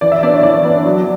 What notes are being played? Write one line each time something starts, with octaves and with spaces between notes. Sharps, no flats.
E3 D5
E5
B3 D4 D5
C#5
E3 D5
B3 D4
F#3